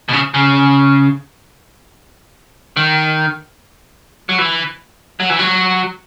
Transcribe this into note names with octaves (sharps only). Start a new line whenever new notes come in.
B2
C#3
C#3
D#3
F#3
E3
F#3
E3
F#3